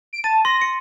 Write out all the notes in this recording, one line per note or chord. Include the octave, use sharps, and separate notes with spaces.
D7
A5 A6 D#7
C6 A#6
C#7